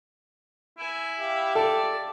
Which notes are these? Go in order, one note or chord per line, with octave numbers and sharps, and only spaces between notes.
E4 G#5
G4 E5 F5
A4 D5